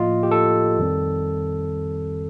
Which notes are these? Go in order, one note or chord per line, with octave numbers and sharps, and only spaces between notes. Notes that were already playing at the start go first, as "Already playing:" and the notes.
Already playing: A2 F3 A#3 F4 D#5
G4
A4
F2 D#3 G3 C4